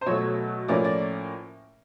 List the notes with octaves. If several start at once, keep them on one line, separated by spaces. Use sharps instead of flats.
C5
B2 F#3 A3 C#5
A2 F3 A#3 C#4 D5
D5